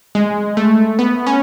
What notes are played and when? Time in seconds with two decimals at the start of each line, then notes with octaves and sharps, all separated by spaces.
0.15 G#3
0.57 A3
0.99 B3
1.26 C#4